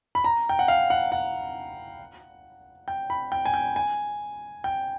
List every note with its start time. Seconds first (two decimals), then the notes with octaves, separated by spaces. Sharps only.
0.15 B5
0.24 A#5
0.49 G5
0.59 F#5
0.68 F5
0.90 F#5
1.12 F#5
2.88 G5
3.10 B5
3.32 G5
3.45 G#5
3.54 G5
3.76 G#5
4.64 G5